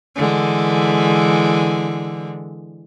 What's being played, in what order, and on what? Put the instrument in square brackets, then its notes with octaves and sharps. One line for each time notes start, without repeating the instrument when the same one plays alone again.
[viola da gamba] D3 E3 G#3